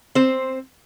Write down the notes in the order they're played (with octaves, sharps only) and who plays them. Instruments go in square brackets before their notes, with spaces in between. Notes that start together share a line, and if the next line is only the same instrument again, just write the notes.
[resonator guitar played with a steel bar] C4 C5